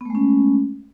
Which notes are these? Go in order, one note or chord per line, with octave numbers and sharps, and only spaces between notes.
G#3 A3 B3 C#4